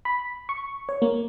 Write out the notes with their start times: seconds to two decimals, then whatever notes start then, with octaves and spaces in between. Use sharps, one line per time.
0.05 B5
0.49 C#6
0.89 C#5
1.02 A#3